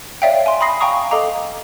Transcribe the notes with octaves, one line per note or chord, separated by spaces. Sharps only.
C#5 D5 E5 F5 G5
G#5 C6
B5 C6 D#6 A#6 C7
F5 G5 G#5 A#5 C#6 D#6
A4 D#5 F5 A#5 D6